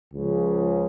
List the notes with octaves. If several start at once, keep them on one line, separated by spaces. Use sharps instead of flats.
C#2 C#3 F3